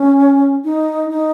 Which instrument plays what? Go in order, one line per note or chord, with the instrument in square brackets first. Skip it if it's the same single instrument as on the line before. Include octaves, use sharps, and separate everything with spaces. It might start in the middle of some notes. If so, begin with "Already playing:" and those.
Already playing: [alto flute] C#4
D#4
D#4